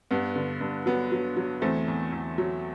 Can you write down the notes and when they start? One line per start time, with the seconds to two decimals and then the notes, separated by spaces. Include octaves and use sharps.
0.11 G2 B3
0.36 D3
0.61 G2
0.86 F#3 B3
1.12 F#3
1.37 F#3
1.62 E2 A3 C4
1.88 E2
2.12 E2
2.38 F#3